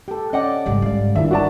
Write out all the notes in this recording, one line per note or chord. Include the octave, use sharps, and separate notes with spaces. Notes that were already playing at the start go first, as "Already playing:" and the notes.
G4 A4 G5
C#4 D5 D#5 F#5 G5
G#1 C#3 G3
G#2 D5 F5
G1 D#3 D4 E4 E5
F#4 D5 A5